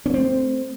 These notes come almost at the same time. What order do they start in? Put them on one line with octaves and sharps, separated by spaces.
C#4 A#3 C4 A3